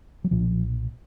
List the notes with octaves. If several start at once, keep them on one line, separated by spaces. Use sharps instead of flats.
F#3
B1 A#2 F3